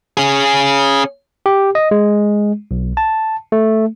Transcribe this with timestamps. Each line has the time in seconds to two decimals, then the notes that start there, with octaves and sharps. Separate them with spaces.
0.17 C#4 G#4
1.46 G4
1.75 D#5
1.91 G#3
2.71 B1
2.97 A5
3.52 A3